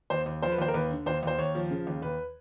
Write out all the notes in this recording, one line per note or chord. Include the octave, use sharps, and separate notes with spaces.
D#2 C5
D#2
F3 C5
B4
D#2 C5
A#4
D#2 B4
D3
D#2 C5
D#2 C5
D#2 C#5
F3
C#3
D#2
D#2 B4